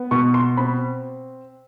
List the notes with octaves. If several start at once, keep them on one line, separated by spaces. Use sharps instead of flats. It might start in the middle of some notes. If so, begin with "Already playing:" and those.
Already playing: B3
B2 C#6
C6
C4 B5